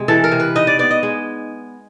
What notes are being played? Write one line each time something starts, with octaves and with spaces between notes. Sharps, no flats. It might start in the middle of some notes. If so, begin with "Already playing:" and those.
Already playing: C3 G#3
E3 A4
A#4
C3
B4
D#4 D#5
D5
B3 D5
D#5
G#3